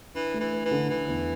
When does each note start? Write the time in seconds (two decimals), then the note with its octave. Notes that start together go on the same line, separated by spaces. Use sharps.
0.15 E3 D4
0.34 A3
0.40 E3
0.53 B4
0.65 E3
0.71 D3
0.89 D3 E3
1.08 E2